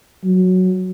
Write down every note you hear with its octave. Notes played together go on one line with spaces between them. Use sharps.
F#3